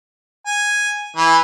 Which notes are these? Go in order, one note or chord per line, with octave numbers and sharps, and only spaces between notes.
G#5
E3